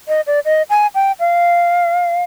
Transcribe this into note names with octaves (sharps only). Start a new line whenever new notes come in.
D#5
D5
D#5
G#5
G5
F5